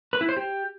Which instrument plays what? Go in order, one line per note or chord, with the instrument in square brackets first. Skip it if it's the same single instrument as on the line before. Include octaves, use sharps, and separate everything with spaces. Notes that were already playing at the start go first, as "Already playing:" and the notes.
[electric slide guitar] B4
E4
C5
G4